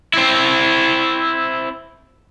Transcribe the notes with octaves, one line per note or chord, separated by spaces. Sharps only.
C4 E4